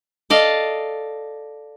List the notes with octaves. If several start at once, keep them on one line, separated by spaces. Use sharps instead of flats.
A4 D5 D#5 F5